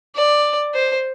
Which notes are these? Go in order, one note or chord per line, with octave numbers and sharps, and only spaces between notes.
D5
C5